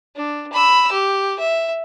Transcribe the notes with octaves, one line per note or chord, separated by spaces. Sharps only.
D4
B5 E6
G4
E5